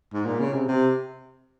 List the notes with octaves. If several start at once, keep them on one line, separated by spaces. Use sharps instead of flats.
G#2
A#2
C#3
C3
C3